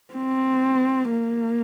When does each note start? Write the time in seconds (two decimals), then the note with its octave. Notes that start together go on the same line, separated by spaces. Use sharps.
0.14 C4
1.10 A#3